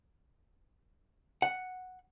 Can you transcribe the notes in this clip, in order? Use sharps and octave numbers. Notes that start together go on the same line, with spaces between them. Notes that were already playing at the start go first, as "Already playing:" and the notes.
F#5